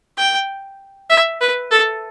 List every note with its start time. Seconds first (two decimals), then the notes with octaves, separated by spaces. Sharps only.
0.17 G5
1.09 E5
1.41 B4
1.71 A4